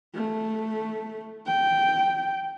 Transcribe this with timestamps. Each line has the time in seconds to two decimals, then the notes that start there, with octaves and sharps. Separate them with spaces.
0.15 A3
1.47 G5